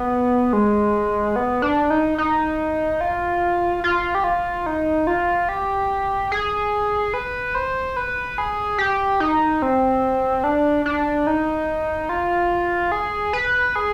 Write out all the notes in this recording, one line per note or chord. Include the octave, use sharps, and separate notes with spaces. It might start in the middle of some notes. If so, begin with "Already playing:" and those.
Already playing: B3
G#3
B3
D4
D#4
D#4
F4
F4
G4
F4
D#4
F4
G4
G#4
B4
C5
B4
G#4
G4
D#4
C4
D4
D4
D#4
F4
G#4
B4
G#4